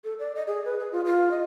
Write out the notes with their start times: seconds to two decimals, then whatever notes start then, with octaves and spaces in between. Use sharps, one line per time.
0.04 A4
0.19 D5
0.35 D#5
0.47 G#4
0.65 B4
0.79 G#4
0.92 F4
1.05 F4
1.31 D#5